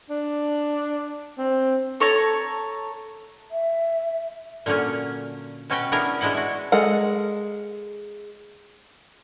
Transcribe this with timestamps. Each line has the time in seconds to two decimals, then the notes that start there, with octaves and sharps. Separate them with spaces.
0.10 D4
1.39 C4
2.00 A4 C#5 A#5
3.51 E5
4.66 A#2 D3 F#3 A#3 C#4
5.70 B2 C#4 F#4 B4 G5
5.92 B3 C#4 D4 E4 G#4 A#4
6.21 G#3 D4 E4 D#5 F#5
6.34 E4 F#4
6.72 G#3 A4 A#4 F#5